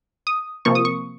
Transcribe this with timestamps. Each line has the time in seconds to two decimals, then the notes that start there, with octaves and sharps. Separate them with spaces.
0.27 D#6
0.65 C3 F3 A#3 C#6
0.75 D#6
0.85 C#6